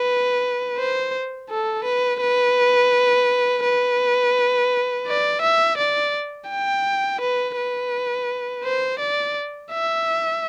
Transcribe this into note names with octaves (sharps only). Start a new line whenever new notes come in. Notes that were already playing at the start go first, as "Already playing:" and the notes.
Already playing: B4
C5
A4
B4
B4
B4
D5
E5
D5
G5
B4
B4
C5
D5
E5